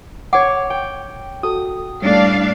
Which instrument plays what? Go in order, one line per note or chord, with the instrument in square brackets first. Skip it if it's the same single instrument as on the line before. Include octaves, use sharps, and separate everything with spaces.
[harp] C#5 D6 [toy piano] F#5
[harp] G5
[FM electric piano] F#4 A4 [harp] D#6
[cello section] A2 D4 F5 [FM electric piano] G3 A3